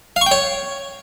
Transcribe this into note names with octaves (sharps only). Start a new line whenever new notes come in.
F5
C#6
G5
C#5